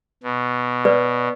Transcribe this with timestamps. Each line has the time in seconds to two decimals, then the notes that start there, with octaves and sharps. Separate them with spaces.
0.23 B2
0.85 B4 D5